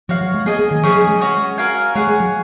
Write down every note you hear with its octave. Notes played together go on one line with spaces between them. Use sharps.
F3 F#4 C#5 F5
F#3
G#3
A#3 G#4 D#5 G#5
A#3
D#3
F3 C#4 G#4 B4 D#5
F#3
G#3
C#4 F#4 C#5
F#4 A#4 F5 G#5
G#3 G#4 C#5 F#5
G#3
F#3